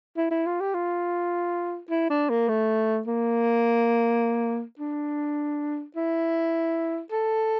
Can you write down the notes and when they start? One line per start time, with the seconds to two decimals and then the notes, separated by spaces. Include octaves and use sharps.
0.17 E4
0.31 E4
0.47 F4
0.61 G4
0.75 F4
1.90 E4
2.10 D4
2.30 A#3
2.49 A3
3.07 A#3
4.79 D4
5.96 E4
7.12 A4